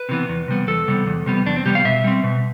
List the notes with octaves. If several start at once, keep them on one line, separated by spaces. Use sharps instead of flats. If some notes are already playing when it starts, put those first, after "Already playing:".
Already playing: B4
C3 E3 B3
E2
C3 G3 B3
E2 A4
C3 G3 B3
E2
C3 G3 B3
E2 D4
C4
C3 G3 B3 G4
F5
B2 E5
G3 C4
B2